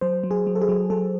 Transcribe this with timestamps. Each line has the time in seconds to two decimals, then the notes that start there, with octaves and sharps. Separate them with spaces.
0.01 F#3 C5
0.24 F#3
0.31 G#4
0.47 F#3
0.55 A4
0.62 G#4
0.69 F#3
0.90 F#3 A4